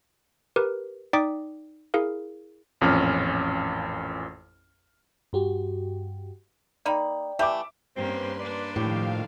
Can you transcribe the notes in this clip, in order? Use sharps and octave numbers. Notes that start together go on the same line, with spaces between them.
G4 A#4 B4
D#4 D5 G5 D6 D#6 B6
E4 G#4 A#4 F5
A1 F2 A#2 C#4 F6
G2 F#4 G4
A#3 D#4 D5 G5 B5
E3 A3 G4 E5 D6
G2 A#3 C4 C#4 B4 C6
A#3 D4 D5
A2 D#3 F3 G4 F5